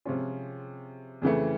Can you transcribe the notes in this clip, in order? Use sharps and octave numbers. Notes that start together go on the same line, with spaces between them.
C3 F3 G#3 C#4 F4
F2 C#3 E3 A3